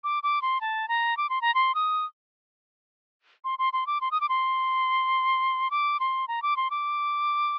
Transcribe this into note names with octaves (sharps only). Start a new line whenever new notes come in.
D6
D6
C6
A5
A#5
D6
C6
A#5
C6
D#6
C6
C6
C6
D6
C6
D#6
D6
C6
D6
C6
A#5
D6
C6
D6